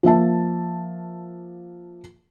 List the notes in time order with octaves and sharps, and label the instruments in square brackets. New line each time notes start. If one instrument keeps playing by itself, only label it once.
[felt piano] F3 A#3 E5 A5